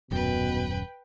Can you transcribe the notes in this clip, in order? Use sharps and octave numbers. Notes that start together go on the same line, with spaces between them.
D#1 F#2 B2 B4 G5